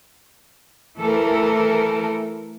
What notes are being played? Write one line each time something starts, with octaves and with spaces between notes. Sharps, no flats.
E3 A3 A4 A#4